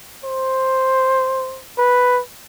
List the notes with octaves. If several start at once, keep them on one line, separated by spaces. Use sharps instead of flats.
C5
B4